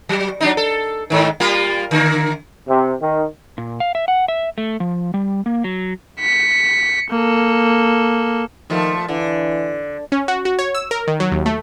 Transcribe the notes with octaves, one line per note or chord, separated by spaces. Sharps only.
F#3
F#3 D4 D#4
A4
G#2 D#3
G3 A#3 F4
D3 A#3
C3
D#3
A#2
F5
E5
F#5
E5
A3
F3
G3
A#3
F#3
B6 C#7
A#3 A4
A#2 D#3 F3 A3
D3 E3
C#4
F#4
F#4
C#5
E6
A#4
D#3
F#3
D#2
A3